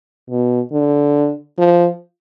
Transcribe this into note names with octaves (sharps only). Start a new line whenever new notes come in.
B2
D3
F3